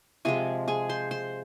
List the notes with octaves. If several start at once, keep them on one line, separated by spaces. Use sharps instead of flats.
C3 F3 G#3 G#4 G#5
G#4 G#5
C5 C6
C5 C6